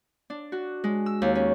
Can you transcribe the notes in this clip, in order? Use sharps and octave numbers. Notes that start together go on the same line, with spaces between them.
D4
F#4
G#3
E6
D#2
C#4